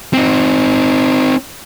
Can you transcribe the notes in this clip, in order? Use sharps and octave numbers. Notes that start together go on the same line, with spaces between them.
C4 D#4